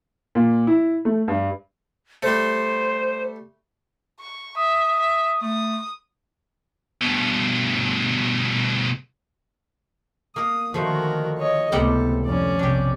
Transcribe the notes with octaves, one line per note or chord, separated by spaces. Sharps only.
A#2
E4
A3
G2
G3 A3 C5
C#6
E5 D#6
E5
A3 D#6
G2 B2
A#3 A#4 D#6
D3 D#3 F3 A3 F#4 A#4
C#5 D#5
C#2 A2 C3 G3 B3 A4 F#5
F2 D3 C#4 D5
B1 C3 D4 G4